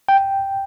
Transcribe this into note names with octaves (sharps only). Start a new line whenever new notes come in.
G5